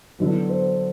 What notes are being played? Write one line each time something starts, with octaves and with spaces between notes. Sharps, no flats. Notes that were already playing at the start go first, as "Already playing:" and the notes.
D3 F#3 B3
C5